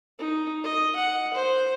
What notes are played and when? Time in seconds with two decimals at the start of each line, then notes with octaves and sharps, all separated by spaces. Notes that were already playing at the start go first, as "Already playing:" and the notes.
0.19 D#4
0.64 D#5
0.96 F#5
1.33 C5